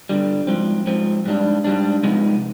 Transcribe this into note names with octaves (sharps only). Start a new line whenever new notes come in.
G2 D3 G3
G#2 F3 C4
G#2 F3 C4
G#2 G3 D4
G#2 G3 D4
C3 F3 G#3 B3 D#4